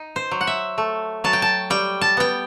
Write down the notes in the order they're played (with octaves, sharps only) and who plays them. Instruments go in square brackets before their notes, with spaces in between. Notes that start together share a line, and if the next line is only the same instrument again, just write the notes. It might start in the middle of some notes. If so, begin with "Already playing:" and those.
Already playing: [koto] D#4
C5
F#3
F#5
E5
A3
F#3 A5
G5
A5
G3 G5
A5
B3 G5